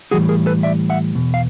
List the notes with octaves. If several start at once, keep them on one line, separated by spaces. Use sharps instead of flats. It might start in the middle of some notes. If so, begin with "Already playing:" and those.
A2 E3 G3 F#4 G#4
G#4 A#4
A4 B4
D5 E5
E5 F#5
E2 B2
F5